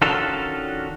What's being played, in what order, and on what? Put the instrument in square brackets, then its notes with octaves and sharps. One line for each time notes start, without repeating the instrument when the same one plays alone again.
[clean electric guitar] D#3 C#4 D4 F4 F#4 A4